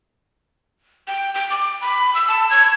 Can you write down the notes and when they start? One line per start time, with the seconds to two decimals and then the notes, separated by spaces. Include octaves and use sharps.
1.08 G5
1.34 G5
1.50 D6
1.81 B5
2.15 E6
2.28 A5
2.50 G#6